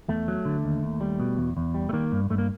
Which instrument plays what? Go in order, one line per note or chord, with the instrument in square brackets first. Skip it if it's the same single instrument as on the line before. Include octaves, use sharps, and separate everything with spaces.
[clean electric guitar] E2 A3
F#3
D3
D#2
D#2
G3
B2
E2
E2
G3
A3
D#3 A#3
G2
G2 A3
A#3